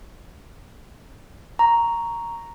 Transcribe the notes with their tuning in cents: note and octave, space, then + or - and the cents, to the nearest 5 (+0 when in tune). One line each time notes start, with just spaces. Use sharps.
A#5 +0 C#6 +0